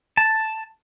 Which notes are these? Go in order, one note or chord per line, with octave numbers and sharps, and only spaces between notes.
A5